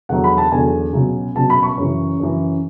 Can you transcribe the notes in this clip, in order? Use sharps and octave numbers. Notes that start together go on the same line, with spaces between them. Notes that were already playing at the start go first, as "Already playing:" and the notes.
E2 D3 F#3 F#5
B5
A5
E2 D3 F#3 G#5
C#2 B2 F#3
C#2 B2 F#3 A5
B5
C#6
F#2 C#3 E3
F#2 C#3 E3